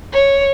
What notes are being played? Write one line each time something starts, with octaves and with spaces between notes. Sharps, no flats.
C#5